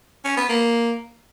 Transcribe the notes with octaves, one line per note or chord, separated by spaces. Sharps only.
C#4
B3
A#3